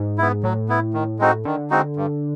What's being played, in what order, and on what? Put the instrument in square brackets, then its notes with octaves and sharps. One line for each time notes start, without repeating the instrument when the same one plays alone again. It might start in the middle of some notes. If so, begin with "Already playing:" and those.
Already playing: [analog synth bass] G#2
[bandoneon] B3 E4
[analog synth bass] A2 [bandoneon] F#3
[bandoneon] B3 E4
D#3
G#3 C4 D#4 F#4
[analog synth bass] D3 [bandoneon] D#3
[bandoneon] G#3 C4 D#4 F#4
G2